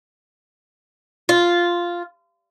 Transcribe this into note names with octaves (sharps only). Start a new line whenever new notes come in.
F4